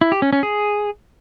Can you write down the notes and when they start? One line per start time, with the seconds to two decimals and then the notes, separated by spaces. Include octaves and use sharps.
0.01 E4
0.12 G4
0.22 C#4
0.33 C#4
0.43 G#4